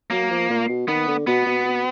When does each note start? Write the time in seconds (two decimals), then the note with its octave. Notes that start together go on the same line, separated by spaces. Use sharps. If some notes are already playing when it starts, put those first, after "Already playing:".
0.10 F#3 A#3
0.31 F3
0.50 A#2
0.69 B2
0.88 D#3 B3
1.08 D3
1.27 B2 B3
1.46 B2
1.65 B2